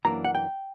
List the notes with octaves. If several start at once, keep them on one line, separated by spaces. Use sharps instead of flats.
F#2 E3 A#3 D4 A#5
F#5
G5